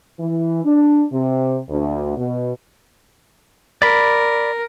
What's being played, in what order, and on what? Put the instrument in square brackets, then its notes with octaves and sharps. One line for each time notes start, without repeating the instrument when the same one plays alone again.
[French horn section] E3
D4
C3
D2
B2
[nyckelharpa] A#4 [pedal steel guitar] D5 B5